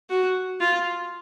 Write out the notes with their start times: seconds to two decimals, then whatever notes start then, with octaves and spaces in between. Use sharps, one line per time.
0.10 F#4
0.60 F4